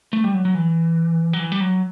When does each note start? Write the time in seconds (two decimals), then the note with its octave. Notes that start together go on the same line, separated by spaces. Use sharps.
0.13 A3
0.24 G3
0.34 F#3
0.45 F#3
0.55 E3
1.33 F#3
1.39 E3
1.52 G3
1.60 F#3